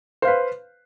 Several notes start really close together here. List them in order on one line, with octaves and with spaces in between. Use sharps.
C5 F5 B4